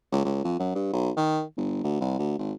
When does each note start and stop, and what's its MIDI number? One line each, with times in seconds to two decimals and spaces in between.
0.12 0.22 37
0.24 0.43 37
0.44 0.57 41
0.59 0.71 42
0.75 0.91 43
0.93 1.10 35
1.16 1.43 51
1.57 1.83 31
1.84 1.99 38
2.00 2.18 36
2.19 2.38 38
2.39 2.52 32